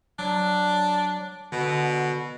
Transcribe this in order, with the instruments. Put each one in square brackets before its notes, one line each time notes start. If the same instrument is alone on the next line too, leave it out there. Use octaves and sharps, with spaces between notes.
[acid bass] F#3 [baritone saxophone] D4
[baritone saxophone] B2 [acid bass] D3